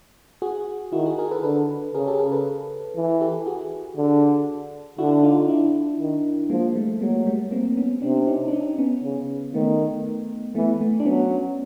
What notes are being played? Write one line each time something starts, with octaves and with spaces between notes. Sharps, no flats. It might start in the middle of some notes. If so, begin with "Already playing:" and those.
F#4 G#4
D#3 E4 F#4
F#4 G#4
G#4 A#4
A4 B4
D3 A4 B4
C#3 G#4 A#4
G4 A4
G#4 A#4
A4 B4
E3
G4 A4
F#4 G#4
D3
D3 E4 F#4
D#4 F4
D4 E4
D#3
F3 G#3 A#3
G3 A3
F#3 G#3 A#3
G3 A3
A#3 C4
B3 C#4
C3 C4 D4
C#4 D#4
D4
C#4 D#4
B3 C#4
C#3
D#3 A3 B3
E3 A3 B3
A3 B3
D4
F#3 B3 C#4